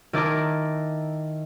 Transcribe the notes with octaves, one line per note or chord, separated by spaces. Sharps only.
D#3 E4 A#4 A5 D6